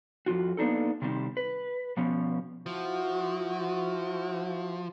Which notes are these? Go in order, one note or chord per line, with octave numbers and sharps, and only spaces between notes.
F2 C3 F4 F#4
A#3 B3 D4 D#4 A4
C3 D#3 G3 A#3 C4
B4
B2 F3 B3 C#4
F3 E4 F#4